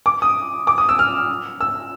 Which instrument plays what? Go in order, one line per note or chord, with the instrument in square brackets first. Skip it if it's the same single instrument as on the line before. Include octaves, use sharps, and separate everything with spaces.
[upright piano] D6
D#6
D6
D#6
E6
F6
E6